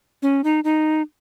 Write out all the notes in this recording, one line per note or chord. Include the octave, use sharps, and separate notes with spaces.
C#4
D#4
D#4